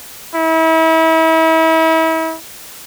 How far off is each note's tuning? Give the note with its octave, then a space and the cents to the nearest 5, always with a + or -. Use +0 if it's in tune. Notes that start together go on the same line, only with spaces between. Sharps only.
E4 -35